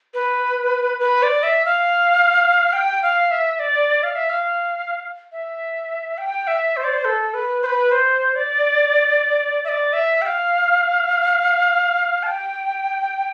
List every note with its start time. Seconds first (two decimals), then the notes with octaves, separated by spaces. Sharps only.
0.14 B4
1.00 B4
1.23 D5
1.43 E5
1.65 F5
2.73 G5
3.02 F5
3.31 E5
3.59 D5
4.03 F5
4.16 E5
4.29 F5
5.32 E5
6.18 G5
6.47 E5
6.77 C5
6.84 D5
6.93 C5
7.05 A4
7.34 B4
7.62 C5
7.66 B4
7.92 C5
8.35 D5
9.64 E5
9.69 D5
9.93 E5
10.22 G5
10.26 F5
12.23 A5
12.27 G5